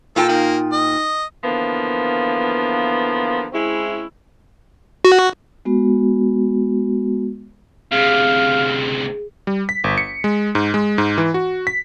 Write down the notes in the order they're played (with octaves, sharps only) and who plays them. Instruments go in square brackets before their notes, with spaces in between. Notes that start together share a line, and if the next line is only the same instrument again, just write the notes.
[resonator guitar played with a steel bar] A#2 F4 G5 [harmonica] A4
[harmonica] A#3 [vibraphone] D#4
[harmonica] D#5
[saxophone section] D3 E3 F3 A#3 B3
G#3 C4 C#4 E4
[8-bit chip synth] F#4
[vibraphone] G#3 B3 F#4
[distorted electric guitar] D2 C3 [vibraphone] G#4 [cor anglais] F5
[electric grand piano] G3
B6
G1
C#7
G#3
G#2
G#3
G#2
E3
F#4
B6